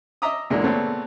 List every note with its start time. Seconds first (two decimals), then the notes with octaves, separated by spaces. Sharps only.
0.22 D#5 E5 A#5 D6 D#6
0.50 E2 A#2 D3 E3 G#3 A#3
0.64 A#2 C#3 A3 B3 C4